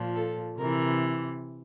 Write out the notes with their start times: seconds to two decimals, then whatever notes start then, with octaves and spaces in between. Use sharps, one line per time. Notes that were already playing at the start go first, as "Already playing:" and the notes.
Already playing: A#2 F3
0.16 A4
0.57 C3 E3 A#4